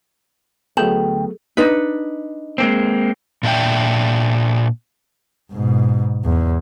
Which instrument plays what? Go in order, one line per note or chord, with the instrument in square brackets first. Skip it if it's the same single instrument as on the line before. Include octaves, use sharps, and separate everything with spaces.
[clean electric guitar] D2 G5 [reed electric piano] F#3 A3 B3 [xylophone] G#4 A4 E7
[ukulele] D4 D#4 B4
[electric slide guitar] G#3 A#3 C4
A#2 D4 E5 G5
[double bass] G#2 B2
E2